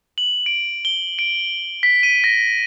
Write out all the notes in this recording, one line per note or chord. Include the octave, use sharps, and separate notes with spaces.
F#7
D7
G7
D7
B6
D#7
A#6